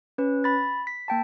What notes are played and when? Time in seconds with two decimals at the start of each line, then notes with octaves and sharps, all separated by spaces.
0.18 C#4 B4
0.44 B5 A6
0.87 B6
1.08 A#3 G5 A5